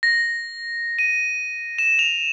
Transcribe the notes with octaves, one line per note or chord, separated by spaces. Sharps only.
A#6
D#7
E7
F7